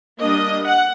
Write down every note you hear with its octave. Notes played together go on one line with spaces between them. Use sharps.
G3 A#3 D4 D#5
F#5